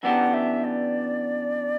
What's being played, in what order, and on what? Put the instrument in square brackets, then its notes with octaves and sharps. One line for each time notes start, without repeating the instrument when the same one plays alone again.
[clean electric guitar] F#2 E3 B3 D4 G4 [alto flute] F#5
[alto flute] E5
D5